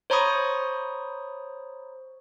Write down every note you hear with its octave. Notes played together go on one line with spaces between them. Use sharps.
C5 C#5 A#5 B5 C#6 D#6